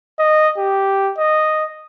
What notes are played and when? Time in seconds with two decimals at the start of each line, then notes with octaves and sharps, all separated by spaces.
0.19 D#5
0.58 G4
1.18 D#5